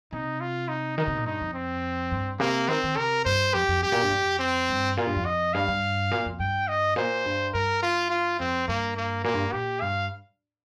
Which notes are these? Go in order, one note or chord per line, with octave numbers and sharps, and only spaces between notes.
C3 D#4
F4
D#4
D#3 D#4
C3
A#2
G2 D#4
F2
C4
G2
C3 A#3
D#3 C4
D#3
C3 A#4
G2 C5
F2 G4
F2
G2 G4
A#2
G2
F2
C4
G2
A#2 F4
G2
F2
D#5
G2 F5
G2
A#2
F2
G2 G5
D#5
A#2 C5
G2
G2 A#4
F4
F4
F2 C4
G2 A#3
A#3
A#2 A#3
G2
A#2 G4
G2 F5